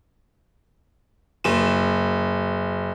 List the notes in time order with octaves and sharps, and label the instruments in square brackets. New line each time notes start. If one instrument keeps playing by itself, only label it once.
[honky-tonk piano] F#1 E7